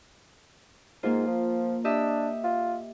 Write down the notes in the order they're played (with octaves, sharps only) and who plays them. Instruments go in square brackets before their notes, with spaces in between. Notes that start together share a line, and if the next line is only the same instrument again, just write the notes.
[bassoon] G#2 [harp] A#3 F4
[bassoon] F3
[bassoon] D4 [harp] G4 D#5 E5
[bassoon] F4